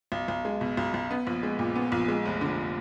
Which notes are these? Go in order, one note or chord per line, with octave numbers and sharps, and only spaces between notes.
B1
B1
G#3
B2
B1
B1
B3
A#1
G#3
A#2
B3
A#1
G#3
F1
D3